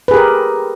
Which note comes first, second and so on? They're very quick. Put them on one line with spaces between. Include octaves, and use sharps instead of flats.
B4 G#4 G4 A#4